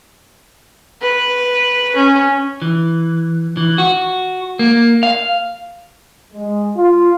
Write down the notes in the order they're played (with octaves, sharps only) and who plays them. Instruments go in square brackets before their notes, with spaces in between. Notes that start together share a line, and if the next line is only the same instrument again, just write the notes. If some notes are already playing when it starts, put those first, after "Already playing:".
[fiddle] B4
C#4
[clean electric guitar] E3
E3
F#4
A#3
F5
[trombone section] G#3
F4